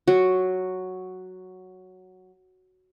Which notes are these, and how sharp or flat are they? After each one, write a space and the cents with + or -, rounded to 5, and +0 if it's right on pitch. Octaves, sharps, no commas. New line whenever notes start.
F#3 +0 F#4 +0